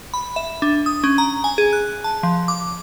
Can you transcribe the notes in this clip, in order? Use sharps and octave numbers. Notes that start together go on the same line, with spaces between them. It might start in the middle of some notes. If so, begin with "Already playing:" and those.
B5
E5
D4
D#6
C#4
A#5
G#5
G#4
F#6
A5
F3
D6